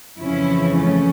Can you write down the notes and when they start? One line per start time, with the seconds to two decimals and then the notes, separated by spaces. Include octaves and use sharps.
0.19 F2 C#3 E3 C#4 E4
0.75 A3 C#4